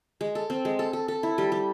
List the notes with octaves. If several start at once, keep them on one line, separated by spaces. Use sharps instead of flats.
G#3
A4
C4
G#3
A4
A4
A4
E4
G3
G3